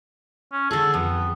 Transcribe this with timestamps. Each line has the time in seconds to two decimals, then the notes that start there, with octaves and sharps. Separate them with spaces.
0.52 C#4
0.71 D3 G#4 A4
0.94 F2 B3